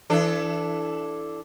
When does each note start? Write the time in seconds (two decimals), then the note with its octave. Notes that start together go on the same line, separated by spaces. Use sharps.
0.10 E3 D4 A4